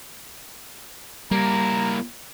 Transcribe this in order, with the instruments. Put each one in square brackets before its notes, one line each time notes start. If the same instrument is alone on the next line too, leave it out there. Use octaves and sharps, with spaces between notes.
[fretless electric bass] G3 [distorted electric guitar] A#3 E4 [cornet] A#5